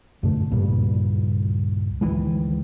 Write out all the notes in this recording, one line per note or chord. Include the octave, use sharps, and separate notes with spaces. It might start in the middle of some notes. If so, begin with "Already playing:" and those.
F#2 B2 D3 A3
C#2 G2 A#2 G3
D2 D#3 E3 G#3